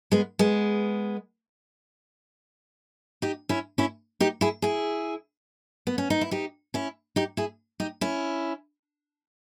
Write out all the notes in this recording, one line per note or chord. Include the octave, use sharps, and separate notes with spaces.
G#3 B3
G#3 B3
D#4 G4
C#4 E4
C#4 E4
D#4 G4
E4 G#4
E4 G#4
B3
C#4
D#4
E4
D#4 G4
C#4 E4
D#4 G4
E4 G#4
D#4 G4
C#4 E4